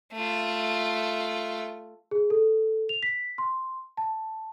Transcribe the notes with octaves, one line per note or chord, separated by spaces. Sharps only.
A3 F4
G#4
A4
F7
B6
C6
A5